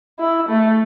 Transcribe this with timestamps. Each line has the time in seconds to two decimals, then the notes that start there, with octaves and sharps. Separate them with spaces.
0.19 E4
0.49 A3